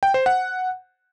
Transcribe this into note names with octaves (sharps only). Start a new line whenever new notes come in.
G5
C5
F#5